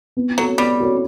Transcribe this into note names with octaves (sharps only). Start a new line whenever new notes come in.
B3
F#3 F#4 A4 C#5
G3 B3
F#4 A4 C#5